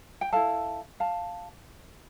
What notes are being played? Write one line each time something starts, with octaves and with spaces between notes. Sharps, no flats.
G5
E4 A4 F5 A5
F5 A5